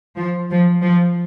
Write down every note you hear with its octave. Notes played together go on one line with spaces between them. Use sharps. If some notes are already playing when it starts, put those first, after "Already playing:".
F3
F3
F3